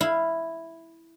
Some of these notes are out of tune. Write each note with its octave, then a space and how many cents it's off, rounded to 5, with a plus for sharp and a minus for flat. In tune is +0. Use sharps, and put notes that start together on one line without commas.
E4 +0 F5 -10